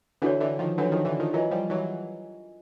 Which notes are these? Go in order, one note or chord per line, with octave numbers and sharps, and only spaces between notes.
D3 E3 D4 F#4 A4 C#5
D3 E3
D#3 F3
E3 F#3 D4 F#4 A4 C#5
D#3 F3
D3 E3
D#3 F3
E3 F#3 F4 A#4 D#5 G#5
F3 G3
E3 F#3